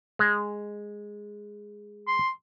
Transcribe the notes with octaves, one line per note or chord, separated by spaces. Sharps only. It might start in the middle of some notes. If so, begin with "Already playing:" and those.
G#3
C6